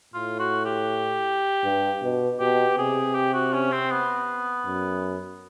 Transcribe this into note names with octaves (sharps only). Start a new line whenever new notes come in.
A2 F4
F#4
G4
G2
B2
B2 G4
C3 G#4
G4
F#4
C#4
C4
B3
F#2